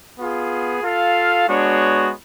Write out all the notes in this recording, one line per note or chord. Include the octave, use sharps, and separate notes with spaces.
B3 F4 G#4
F4 A4 F5
G#3 B3 D4 F#4 C#5